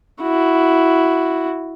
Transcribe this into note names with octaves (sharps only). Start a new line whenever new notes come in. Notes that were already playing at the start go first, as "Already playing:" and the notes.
E4 F#4